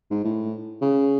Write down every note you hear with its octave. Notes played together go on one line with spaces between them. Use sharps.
G#2
A2
C#3